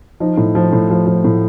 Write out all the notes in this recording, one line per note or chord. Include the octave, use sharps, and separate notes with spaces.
F3 D#4
A2
F3
A2
F3
F3
A2